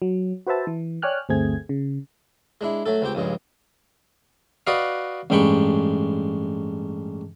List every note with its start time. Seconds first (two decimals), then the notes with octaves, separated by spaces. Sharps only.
0.02 F#3
0.47 F#4 B4 C5 E5 A5
0.67 E3
1.02 C#5 D5 G5 G#5 F6 F#6
1.29 G1 D2 A3 C4 G#4 G#6
1.69 C#3
2.61 G#3 D4 E4
2.86 F#3 A3 A4
3.02 C#2 C4 G4 G5
3.15 A#1 G2 C#3 G#3
4.67 F#4 B4 D5 D#5 F5
5.30 A1 G2 G#3 G5 B5 C#6